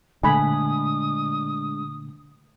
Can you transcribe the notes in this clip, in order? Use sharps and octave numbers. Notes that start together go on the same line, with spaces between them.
A#2 D3 G#3 A3 D4 G#5 B5 D#6